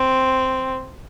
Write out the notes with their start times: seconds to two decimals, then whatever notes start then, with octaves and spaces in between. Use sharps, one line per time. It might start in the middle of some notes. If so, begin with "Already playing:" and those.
Already playing: C4